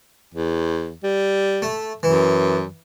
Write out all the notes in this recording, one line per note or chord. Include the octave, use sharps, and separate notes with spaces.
E2
G3
A3
F#2 E3